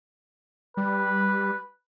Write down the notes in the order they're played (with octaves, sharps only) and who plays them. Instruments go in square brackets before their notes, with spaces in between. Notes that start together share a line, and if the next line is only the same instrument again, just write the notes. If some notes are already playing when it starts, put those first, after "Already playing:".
[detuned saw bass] G3 [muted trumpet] B4